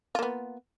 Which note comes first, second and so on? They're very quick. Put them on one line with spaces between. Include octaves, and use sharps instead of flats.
F4 A#3 B3